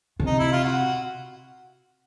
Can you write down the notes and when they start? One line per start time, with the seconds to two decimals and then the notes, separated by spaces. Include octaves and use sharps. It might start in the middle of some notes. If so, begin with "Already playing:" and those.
0.20 C3
0.27 D#4
0.39 E4
0.52 F4
0.64 F#4